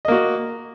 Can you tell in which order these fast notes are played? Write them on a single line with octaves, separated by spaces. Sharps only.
D#5 A#3 F#4